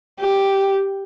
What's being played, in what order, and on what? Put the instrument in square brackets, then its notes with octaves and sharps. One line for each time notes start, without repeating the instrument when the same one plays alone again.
[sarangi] G4